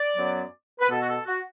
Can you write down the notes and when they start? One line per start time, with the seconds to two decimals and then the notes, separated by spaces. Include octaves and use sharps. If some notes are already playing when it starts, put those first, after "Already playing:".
Already playing: D5
0.16 F#2 F#3 B3
0.80 B4
0.89 B2 B3 A4
1.02 F#4
1.07 A4
1.26 F#4